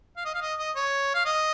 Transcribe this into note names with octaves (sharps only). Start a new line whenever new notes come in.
F5
D#5
F5
D#5
D#5
C#5
F5
D#5